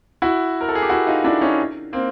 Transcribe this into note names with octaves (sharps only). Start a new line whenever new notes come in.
E4 F#4
A#4
A4
G#4
G4
E4 F#4
D#4 F4
D4 E4
C#4 D#4
A#3 C4